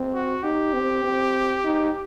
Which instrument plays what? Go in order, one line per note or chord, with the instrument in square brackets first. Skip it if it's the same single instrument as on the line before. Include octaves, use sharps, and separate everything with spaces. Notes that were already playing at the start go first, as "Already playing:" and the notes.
Already playing: [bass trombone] C4
[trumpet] F#4
[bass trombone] D#4 [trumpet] G4
[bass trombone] C4
C4
D#4